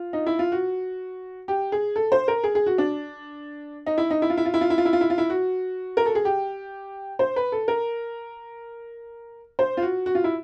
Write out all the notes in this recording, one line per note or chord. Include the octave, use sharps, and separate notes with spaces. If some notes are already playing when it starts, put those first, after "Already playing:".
Already playing: F4
D#4
E4
F4
F#4
G4
G#4
A4
C5
A#4
G#4
G#4
F#4
D4
D#4
E4
D#4
E4
F4
E4
F4
E4
F4
E4
F4
E4
F4
E4
F4
E4
F#4
A#4
A4
G#4
G4
C5
B4
A4
A#4
C5
F4
F#4
F#4
F4
E4